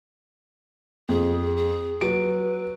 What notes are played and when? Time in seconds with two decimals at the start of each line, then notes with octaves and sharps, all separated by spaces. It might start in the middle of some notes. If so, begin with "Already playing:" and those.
1.09 F2 G#4
1.56 G#4
2.01 F#3 B4 D7